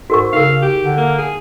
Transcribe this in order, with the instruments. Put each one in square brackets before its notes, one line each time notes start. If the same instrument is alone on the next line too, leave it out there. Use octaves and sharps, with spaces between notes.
[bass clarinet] G#2 [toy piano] F#4 A#4 C#6
[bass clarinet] C#3 [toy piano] D#4 A#4 [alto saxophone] F5
[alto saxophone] G4
[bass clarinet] D3
[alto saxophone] A#3
G#4